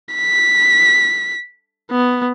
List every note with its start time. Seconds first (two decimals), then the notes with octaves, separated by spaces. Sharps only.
0.15 B6
1.91 B3